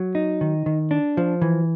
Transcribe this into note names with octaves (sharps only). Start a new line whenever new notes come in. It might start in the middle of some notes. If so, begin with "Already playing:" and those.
Already playing: F#3
D#4
D#3
D#3
D4
F3
E3